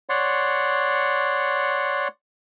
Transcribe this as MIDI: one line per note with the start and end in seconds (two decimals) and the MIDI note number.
0.09 2.08 73
0.09 2.08 74
0.09 2.08 78
0.09 2.08 84